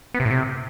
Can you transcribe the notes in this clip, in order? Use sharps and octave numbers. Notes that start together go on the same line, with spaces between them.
B3
C3
A2
C3